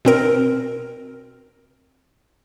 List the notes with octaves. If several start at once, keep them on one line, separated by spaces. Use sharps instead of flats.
B2 C4 A#4